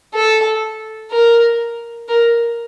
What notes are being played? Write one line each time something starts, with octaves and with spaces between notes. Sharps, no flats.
A4
A#4
A#4